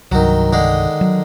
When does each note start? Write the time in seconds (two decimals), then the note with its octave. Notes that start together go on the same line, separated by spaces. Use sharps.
0.12 C2 G2 D#3 F#3
0.53 D3 D#3 G#3
1.01 F#3